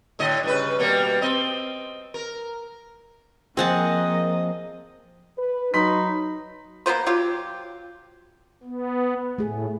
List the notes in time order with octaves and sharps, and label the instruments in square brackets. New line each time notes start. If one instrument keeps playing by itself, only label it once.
[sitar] A2 D3 D#5
G2 C#3 B4
B2 G3 A#3
C4 D#5
A#4
[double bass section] F3 A#3 [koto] C4 [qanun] G#4 F#5 A5 [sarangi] D#5
[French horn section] B4
[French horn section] F#3 [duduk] D#4 [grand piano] B5 C6 B6
[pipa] A#3 B3 B4 C5
F#3 F4 G4
[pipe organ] B3
[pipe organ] A2 [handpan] A3 G#4